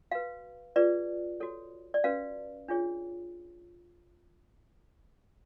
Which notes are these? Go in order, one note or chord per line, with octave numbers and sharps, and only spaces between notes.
F#4 B4 F5
F4 G#4 B4 D5
F#4 A4 C#5
D5
C#4 F#4 B4 F5
D4 F4 G#4 C#5